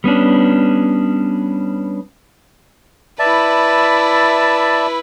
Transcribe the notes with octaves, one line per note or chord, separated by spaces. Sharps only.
G3 B3 C#4 D4
E4 B4 D5 E5 A5